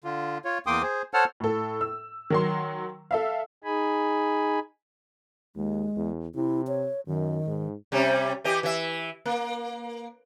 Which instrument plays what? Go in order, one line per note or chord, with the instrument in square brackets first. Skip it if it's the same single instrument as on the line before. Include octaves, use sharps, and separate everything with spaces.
[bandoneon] D3 F4
F4 C#5
E2 A#3 G5 C6 D6 D#6
G#4 C5
A4 C5 C#5 F#5 A5 F6
[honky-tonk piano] A2 A4
E6
D#3 F#3 C6
A4 E5 F5
[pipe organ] D#4 G#4 G#5 B5
[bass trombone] D#2 [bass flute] G#3
[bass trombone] E2
[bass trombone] C3 [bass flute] E4
[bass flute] C#5
[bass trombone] F#2 [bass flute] D#3
[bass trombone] G#2
[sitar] C3 G3 C#4
E3 G4 D#5
E3 E5
A#3